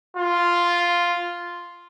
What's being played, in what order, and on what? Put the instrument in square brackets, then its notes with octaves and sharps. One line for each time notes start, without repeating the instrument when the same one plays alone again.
[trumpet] F4